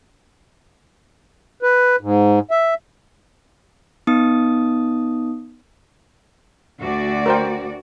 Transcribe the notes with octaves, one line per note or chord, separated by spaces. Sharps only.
B4
G#2
E5
B3 D#4 D#6
D2 F#4 D5
A#4 C5 G5